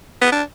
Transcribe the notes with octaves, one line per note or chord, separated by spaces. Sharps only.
B3
D4